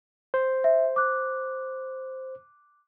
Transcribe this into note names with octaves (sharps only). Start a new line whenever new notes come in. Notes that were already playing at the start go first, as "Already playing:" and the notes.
C5
E5
D6 F#6